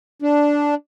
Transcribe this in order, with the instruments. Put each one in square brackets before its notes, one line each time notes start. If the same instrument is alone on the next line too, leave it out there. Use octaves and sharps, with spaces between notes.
[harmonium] D4